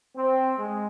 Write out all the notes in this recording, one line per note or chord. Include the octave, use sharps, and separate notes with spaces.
C4
G#3